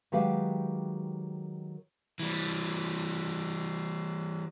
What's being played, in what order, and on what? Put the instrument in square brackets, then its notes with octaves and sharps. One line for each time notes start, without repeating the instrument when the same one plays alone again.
[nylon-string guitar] D#3 F#3 G#3 G4 B4 F5
[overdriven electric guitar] E3 G3